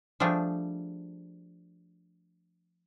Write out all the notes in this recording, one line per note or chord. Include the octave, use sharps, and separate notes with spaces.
F3 G3 A3 D4 G#4